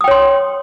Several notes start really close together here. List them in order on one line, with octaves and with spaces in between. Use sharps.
D#6 G5 C#5 C6